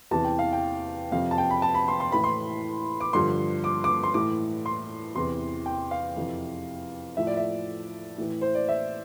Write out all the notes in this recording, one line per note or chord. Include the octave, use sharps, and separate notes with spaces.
E2 C3 E3 A5
G5
F5
G5
F2 C3 F3 F5
A5
G5
B5
A5
B5
C6
C6
A2 E3 B5
C6
D6
G2 D3 F3 C6
D6
D6
C6
A2 E3 D6
C6
E2 C3 E3 C6
G5
F5
F2 C3 E3
A2 F3 E5
D5
E5
A2 E3
C5
D5
E5